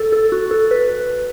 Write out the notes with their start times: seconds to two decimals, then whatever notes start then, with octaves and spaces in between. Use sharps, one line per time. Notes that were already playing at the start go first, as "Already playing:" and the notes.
Already playing: A4
0.12 A4
0.32 F#4
0.51 A4
0.71 B4